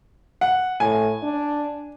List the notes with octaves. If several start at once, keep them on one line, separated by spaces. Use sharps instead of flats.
F#5
A2 G#5
D4